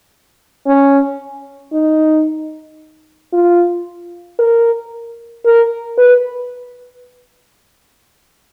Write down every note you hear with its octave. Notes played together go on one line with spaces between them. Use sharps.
C#4
D#4
F4
A#4
A#4
B4